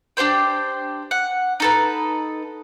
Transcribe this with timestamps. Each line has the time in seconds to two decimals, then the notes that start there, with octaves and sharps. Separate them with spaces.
0.17 D4 G4 C5 G5
1.11 F#5
1.60 D#4 A4 B4